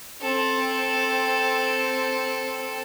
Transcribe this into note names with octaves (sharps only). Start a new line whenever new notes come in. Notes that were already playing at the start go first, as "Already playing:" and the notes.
C4 A4